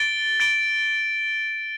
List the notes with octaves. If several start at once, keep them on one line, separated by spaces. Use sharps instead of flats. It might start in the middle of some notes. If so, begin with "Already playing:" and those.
Already playing: A6 D7 G7
A6 D7 G7